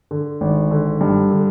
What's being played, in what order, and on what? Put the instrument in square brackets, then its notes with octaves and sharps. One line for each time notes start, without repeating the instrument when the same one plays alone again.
[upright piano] D3
G#1
D3
G2
D3